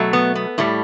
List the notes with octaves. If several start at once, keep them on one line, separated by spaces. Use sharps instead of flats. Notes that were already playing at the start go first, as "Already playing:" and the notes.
Already playing: B2 F#3 A3
B3
B3
A2 G3 A3